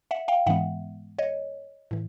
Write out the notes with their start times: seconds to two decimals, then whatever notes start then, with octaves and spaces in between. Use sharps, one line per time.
0.11 E5 F#5
0.28 F5 G5
0.46 G#2 E3 G#3 B3 E5 F#5
1.19 C#5 D#5
1.91 A2 E3